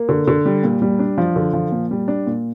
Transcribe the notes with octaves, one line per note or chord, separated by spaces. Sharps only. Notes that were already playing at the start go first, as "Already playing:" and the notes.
Already playing: A#3
D3
D3
G3
A#2
G3
D4
F3
D3
F3
A#2
G3
D4
A#2